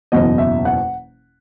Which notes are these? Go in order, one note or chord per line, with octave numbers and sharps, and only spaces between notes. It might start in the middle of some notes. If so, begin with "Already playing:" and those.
F#1 E2 B2 F#3 D#5
E5
F#5